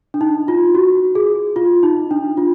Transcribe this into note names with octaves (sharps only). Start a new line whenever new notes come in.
D4
D#4
F4
F#4
G#4
F4
D#4
D4
F4